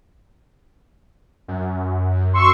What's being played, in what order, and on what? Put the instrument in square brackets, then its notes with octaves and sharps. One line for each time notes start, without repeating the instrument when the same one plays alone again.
[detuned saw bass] F#2
[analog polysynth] C6 C#6 E6